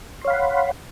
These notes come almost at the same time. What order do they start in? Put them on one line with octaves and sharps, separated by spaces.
C6 C#5 F5 B5 F#5